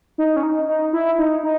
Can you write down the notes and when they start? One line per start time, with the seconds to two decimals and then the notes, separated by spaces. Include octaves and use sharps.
0.18 D#4
0.36 C#4
0.43 D#4
0.68 D#4
0.93 E4
1.18 D#4
1.43 D#4